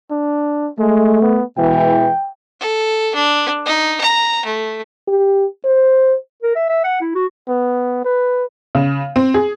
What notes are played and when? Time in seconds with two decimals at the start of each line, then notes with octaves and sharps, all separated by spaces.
0.11 D4
0.79 G#3 A3
1.22 B3
1.58 B2 E3 G#3 G5
2.60 A4
3.15 D4
3.66 D#4
4.01 A#5
4.46 A3
5.08 G4
5.64 C5
6.43 A#4
6.55 E5
6.69 E5
6.84 F#5
7.01 E4
7.15 F#4
7.48 B3
8.05 B4
8.75 C#3
9.16 C4
9.34 G#4